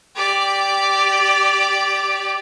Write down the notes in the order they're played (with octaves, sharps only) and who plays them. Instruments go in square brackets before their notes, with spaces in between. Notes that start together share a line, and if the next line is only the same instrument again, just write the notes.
[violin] G4 D5